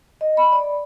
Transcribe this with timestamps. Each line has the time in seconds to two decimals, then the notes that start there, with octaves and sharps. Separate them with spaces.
0.21 D#5
0.37 B5
0.52 D5